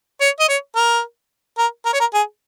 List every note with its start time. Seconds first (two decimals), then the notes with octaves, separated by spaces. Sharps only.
0.21 C#5
0.40 D#5
0.49 C#5
0.76 A#4
1.58 A#4
1.85 A#4
1.93 C#5
2.00 A#4
2.14 G#4